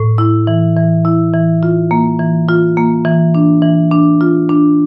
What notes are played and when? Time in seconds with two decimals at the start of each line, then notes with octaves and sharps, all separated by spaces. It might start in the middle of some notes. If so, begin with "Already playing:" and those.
Already playing: A2
0.18 E4
0.47 E3
0.77 E3
1.05 E4
1.33 E3
1.63 F4
1.91 A#3
2.19 E3
2.48 F4
2.77 A#3
3.05 E3
3.35 D4
3.62 E3
3.91 D4
4.21 F4
4.49 D4